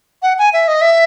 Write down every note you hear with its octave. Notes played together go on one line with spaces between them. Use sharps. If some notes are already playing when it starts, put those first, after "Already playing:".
F#5
G#5
E5
D#5
E5